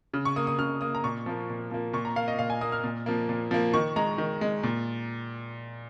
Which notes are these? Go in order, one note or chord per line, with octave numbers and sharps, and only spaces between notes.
C#3
C#6
A#3 D#6
D#6
C#3 F6
A#3 D#6
A#5
A#2 C#6
F3 A#3
A#2
F3 A#3
A#2 C#6
A#5
A#3 F5
D#5
A#2 F5
G#5
A#3 D#6
F6
A#2
F3 A#3
A#2
F3 A#3
D#3 C#6
G#3 A#5
D#3
G#3
A#2